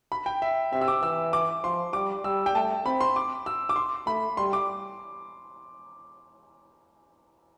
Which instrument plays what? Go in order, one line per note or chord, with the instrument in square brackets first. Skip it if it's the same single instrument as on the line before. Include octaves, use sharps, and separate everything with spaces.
[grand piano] B5
G5
E5
[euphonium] C3 [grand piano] E5
[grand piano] E6
D6
[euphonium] E3 [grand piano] E6
[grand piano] D6
[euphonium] F3 [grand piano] C6
[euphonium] G3 [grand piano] D6
[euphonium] G3 [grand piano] E6
[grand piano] G5
[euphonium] A3 [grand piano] A5
[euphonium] C4 [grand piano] B5
[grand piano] C6
D6
E6
D6
C6
[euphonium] A3 [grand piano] B5
[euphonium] G3 [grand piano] C6
[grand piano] D6